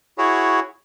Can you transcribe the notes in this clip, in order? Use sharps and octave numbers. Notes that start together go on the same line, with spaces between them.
E4 F#4 G#4 C#5